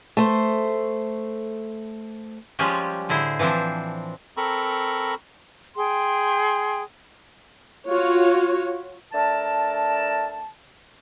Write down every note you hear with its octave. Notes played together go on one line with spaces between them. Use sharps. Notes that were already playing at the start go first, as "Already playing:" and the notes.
A3 C5
F3 G3 G#3 C#4 F4 G4
A2 D3 E4 G#4 C5
E3 F3 C4 D4 C5
C4 A4 A#4 A#5 B5 C#6
G#4 G5 C6
F4 F#4 C#5
A3 D4 A#4 A5